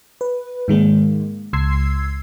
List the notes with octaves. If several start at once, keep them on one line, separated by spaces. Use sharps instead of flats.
B4
G#2 D#3 G#3 A#3
C#2 C6 E6 G#6 C7